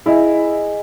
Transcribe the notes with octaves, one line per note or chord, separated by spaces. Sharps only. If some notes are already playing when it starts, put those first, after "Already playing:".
E4 G#4 D#5 G#5